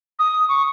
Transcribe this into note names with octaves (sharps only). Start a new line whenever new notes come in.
D#6
C#6